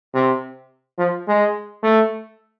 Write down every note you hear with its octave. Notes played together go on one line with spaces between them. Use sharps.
C3
F3
G#3
A3